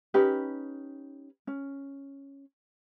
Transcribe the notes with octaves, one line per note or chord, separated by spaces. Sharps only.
C#4 D#4 G4 B4
C#4